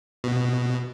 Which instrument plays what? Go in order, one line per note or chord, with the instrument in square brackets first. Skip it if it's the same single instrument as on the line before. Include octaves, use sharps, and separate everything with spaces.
[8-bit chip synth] B2